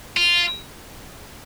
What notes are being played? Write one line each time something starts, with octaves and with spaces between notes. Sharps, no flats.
F4